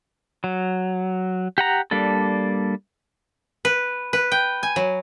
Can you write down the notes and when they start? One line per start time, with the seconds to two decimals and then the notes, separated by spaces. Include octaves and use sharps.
0.44 F#3
1.58 G4 F#5 A#5
1.91 G3 A#3 D4 A4
3.65 B4
4.13 B4
4.32 G5
4.63 G#5
4.76 F#3